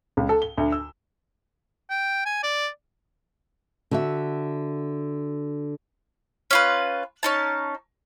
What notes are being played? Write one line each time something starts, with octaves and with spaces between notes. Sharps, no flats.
C#2
A4
G7
D2
E6
G5
G#5
D5
D3 F#4 E5
C#4 F4 B4
C#4 D#4 A5